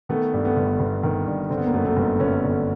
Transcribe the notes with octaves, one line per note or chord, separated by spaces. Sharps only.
D#3 A3 B3
G2
A3 B3
G1
G1
D#3
G2
D3 C4
B3
A#3
F#2 A3 B3
A3 B3
G1
G1 B3 C#4
D3